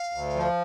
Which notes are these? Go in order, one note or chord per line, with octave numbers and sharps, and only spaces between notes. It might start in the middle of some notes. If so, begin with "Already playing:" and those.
Already playing: F5
D2
F3